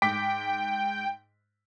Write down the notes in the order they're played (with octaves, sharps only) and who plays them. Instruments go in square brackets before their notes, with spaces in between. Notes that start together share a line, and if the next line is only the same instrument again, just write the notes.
[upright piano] G#2 D6 B6 [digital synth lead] G5